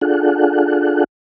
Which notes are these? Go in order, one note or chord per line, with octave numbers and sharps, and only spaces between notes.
D4 F4 G#4 A4 F#5